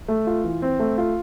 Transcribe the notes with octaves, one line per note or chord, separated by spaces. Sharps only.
A3
F4
E3
C4
A3
F4